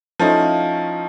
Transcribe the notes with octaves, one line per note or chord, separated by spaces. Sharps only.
F3 A3 C#4 D#4 E4